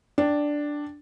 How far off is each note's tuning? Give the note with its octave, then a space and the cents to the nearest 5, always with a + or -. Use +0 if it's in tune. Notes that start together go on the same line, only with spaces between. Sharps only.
D4 +0 G5 +0